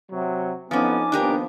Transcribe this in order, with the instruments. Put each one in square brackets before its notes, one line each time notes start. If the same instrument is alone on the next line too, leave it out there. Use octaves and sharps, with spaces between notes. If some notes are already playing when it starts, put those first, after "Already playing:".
[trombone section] C3 F#3
[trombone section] F2 B3 [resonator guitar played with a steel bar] F3 C#4 [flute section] D#4 G#5 D6
[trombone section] D#2 F3 B3 [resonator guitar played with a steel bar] D4 G4 A#4